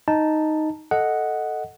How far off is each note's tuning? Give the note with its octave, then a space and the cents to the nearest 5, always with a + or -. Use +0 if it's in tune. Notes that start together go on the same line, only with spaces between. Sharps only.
D#4 +0 A5 +0
A4 +0 D#5 +0 F#5 +0